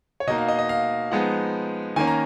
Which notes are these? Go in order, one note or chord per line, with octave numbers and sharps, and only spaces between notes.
C#5
B2 A#3 D#4 D#5
F5
D#5
D#5
F5
F3 G#3 B3 D#4 F#5
D#3 A#3 C#4 G#5
A#5